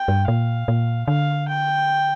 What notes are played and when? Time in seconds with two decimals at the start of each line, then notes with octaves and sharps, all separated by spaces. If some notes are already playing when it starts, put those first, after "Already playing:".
Already playing: G5
0.08 G2
0.28 A#2 F5
0.68 A#2
1.08 D3 F5
1.48 G5